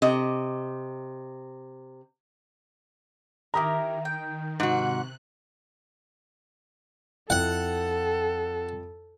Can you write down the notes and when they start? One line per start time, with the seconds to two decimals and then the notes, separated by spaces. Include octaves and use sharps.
0.02 C3 D#5
3.54 D#3 E4 G4 A#4 A#5 D#6
4.05 G5
4.60 G#2 C3 F#4 F#6
7.30 F2 E4 A4 F#5 G5